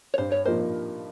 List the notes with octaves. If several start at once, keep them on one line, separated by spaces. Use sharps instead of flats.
C#5
G2 C5
C#5
F3 A#3 D#4 A#4 C5